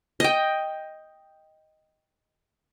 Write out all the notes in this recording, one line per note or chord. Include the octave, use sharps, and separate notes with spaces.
D#5 G5